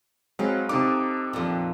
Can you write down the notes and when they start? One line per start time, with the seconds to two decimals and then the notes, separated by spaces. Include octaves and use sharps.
0.39 F#3 G#3 C4 B4 F5
0.69 C3 D#4 A4 D6
1.33 F2 A#2